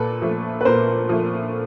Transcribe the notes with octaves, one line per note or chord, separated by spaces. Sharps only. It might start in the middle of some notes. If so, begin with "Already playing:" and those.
Already playing: A#2 A4 B4
F3 A3
B4
A#2 A#4 C5
F3 A3